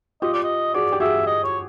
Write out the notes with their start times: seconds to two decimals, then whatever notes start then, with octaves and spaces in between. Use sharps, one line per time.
0.22 F4 G4 D#5
0.33 D5
0.44 D#5
0.74 F#4 G#4 D5
0.92 G4
1.00 F#4 G#4 E5
1.27 D#5
1.44 C#5